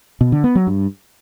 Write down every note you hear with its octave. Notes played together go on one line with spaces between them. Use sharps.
B2
D3
B3
F#3
G2